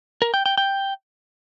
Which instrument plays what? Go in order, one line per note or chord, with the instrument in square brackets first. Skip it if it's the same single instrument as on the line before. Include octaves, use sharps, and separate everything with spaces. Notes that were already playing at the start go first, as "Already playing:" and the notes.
[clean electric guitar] A#4
G5
G5
G5